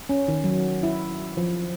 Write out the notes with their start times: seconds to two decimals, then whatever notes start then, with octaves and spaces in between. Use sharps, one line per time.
0.09 C#4
0.28 D#3
0.44 F#3
0.83 E4
1.37 F3